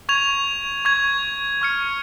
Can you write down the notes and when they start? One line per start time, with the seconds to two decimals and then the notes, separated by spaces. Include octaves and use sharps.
0.09 C#6 G#6 F7
0.85 C#6 G#6 F7
1.61 C#6 F6 C#7